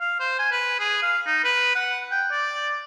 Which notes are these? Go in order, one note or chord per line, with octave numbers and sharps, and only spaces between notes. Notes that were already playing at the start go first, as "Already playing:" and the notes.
F5
C5
G#5
B4
G#4
F5
D#4
B4
F#5
G5
D5